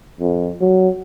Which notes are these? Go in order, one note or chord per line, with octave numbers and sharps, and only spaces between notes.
F2
F#3